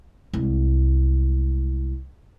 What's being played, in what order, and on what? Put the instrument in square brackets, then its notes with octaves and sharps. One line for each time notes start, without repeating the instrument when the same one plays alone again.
[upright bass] C2 G#3